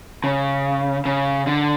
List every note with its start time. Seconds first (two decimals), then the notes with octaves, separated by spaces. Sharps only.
0.24 C#3
1.05 C#3
1.47 D3